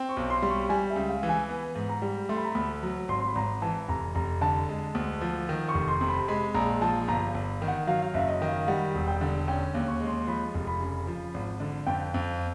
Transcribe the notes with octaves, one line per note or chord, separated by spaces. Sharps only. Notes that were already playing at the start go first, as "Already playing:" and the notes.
Already playing: C4
C#6
B1
C6
G3
C#6
G3 G#5
E5
C#2
F5
E3
G#5
B3
G#2
A#5
G3
A3 C6
B5
A#5
D2 B5
F#3
G#1 C6
C6
B5
G#1 A#5
E3 A5
F1 A#5
F1 A#5
D3 A5
G#3
D2
F3
D#3
C#6
F1
C6
C3
B5
G#3 B5
A#1 A#5
F3 A5
G1 A#5
G1
D#3
F#5
F#3 F5
F5
F#1 E5
D#5
D#3
F5
G3 F#5
E1
G5
D3
C#4 G5
D#2
C#6
G#3
C6
F3 B5
F1
B5
C#3
F3
G#1
D3
F2 G5
F2